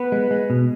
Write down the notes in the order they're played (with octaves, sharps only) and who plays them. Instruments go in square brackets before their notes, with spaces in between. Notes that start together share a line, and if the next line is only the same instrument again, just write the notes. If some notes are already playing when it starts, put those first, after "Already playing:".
Already playing: [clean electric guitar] B3 [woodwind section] B4
[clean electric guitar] G#3
G#3
B2